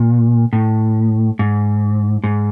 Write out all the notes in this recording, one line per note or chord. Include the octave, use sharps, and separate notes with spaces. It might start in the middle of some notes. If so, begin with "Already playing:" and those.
Already playing: A#2
A2
G#2
G#2